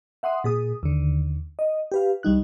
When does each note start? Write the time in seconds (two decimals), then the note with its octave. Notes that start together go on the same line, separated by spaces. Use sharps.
0.23 E5 F#5 C6 D#6
0.44 A#2 G#4 D#6
0.83 D#2 D3
1.59 D#5
1.92 G4 B4 F5
2.23 C2 G3 D#4 F#6